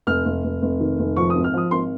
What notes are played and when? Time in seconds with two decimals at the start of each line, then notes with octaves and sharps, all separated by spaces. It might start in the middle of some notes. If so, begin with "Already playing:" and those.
0.07 F1 F6
0.25 F1
0.44 F1
0.62 F1
0.80 D#3
0.99 F1
1.16 F3 C#6
1.30 D#6
1.35 G#1
1.44 F6
1.54 F3 D#6
1.71 G#1 C6